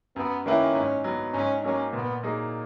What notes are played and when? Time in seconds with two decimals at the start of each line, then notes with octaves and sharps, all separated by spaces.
0.16 F#2 B3
0.46 D#3 A#3 C#4 E4 B4
0.75 G#2
1.04 F#3 B3
1.34 G#2 C#4
1.63 F#3 A#3 C#4
1.93 A#2 B3
2.23 F#3 A#3 D#4 G#4